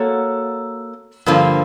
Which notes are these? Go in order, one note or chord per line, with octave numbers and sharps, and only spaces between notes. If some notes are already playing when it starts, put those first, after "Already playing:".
Already playing: A#3 F#4 A4 C#5
G2 D3 F3 A#3